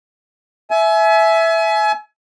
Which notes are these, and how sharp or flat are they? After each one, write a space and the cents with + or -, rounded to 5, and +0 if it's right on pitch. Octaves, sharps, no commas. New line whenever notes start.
E5 +0 G#5 +35